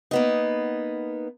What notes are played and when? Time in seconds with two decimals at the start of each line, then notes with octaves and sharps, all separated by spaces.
0.11 A#3 B3 D#4